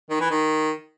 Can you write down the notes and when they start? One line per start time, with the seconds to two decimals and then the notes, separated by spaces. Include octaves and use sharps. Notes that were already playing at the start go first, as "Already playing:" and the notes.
0.10 D#3
0.20 E3
0.31 D#3